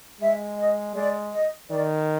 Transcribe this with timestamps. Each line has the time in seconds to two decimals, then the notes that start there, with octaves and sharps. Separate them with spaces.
0.20 G#3 E5
0.58 D#5
0.95 G#3 D5
1.32 D#5
1.70 D#3 D5